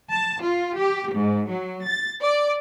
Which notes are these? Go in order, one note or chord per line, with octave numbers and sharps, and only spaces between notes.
A5
F4
G4
G#2
F#3
A6
D5